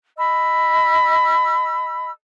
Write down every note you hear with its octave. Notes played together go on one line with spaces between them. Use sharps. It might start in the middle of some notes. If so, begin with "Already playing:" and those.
D#5 B5 E6